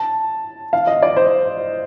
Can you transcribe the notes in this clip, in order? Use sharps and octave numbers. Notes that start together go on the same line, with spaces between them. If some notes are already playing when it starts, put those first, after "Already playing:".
Already playing: A5
F5
D#5
D5
C5